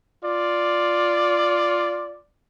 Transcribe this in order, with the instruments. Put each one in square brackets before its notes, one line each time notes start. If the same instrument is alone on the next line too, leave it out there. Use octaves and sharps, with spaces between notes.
[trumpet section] F4 D5